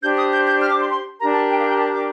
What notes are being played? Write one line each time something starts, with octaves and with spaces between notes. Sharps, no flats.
D4 G4 C5 G6
D#6
G6
G6
F6
D6
C6
C6
D4 G4 A#4 A#5
A5
G5
F5
G5
A5
D6